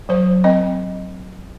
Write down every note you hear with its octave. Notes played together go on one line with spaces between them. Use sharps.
F#3 C5
C4 D#5